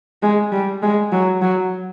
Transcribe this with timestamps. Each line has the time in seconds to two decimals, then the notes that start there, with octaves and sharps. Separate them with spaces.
0.22 G#3
0.52 G3
0.82 G#3
1.11 F#3
1.41 F#3